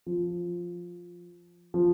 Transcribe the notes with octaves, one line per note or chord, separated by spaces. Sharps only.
F3
F3